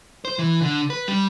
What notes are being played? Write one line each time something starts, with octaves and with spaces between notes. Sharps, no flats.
C5
E3
D3
B4
G3